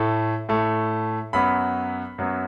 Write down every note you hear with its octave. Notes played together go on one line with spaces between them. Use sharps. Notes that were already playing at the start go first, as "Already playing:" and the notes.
Already playing: A2 A3
A2 A3
F#2 F#3 B3 B5
F#2 F#3 B3